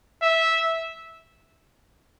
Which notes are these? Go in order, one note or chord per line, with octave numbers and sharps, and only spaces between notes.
E5